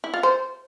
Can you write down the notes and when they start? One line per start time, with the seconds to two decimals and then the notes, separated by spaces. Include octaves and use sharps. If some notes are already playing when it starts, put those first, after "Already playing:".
0.04 E4
0.14 F4
0.23 C5